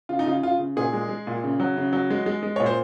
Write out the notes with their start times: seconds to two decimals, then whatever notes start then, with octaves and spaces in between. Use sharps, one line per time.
0.09 C#3 F4
0.19 D#4
0.26 C#3 F4
0.43 C#3 F4
0.59 C#3
0.76 A#2 G#4
0.93 G#3
1.09 G#3
1.27 A#2
1.44 C#3
1.60 F#3
1.77 C#3
1.93 F#3
2.10 G#3
2.26 G#3
2.43 G#3
2.56 A#2 C#5
2.66 C5